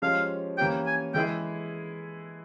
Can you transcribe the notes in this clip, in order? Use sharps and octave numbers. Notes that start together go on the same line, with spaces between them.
F3 G#3 C#4 G4 F5
E3 A#3 C#4 G4 G5
G#5
E3 G#3 E4 G#4 G5